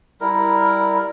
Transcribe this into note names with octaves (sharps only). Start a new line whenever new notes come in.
G3 E4 A#4